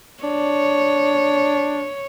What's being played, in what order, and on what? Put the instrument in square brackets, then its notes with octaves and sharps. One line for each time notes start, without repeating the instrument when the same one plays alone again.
[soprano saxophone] D4 [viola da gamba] C#5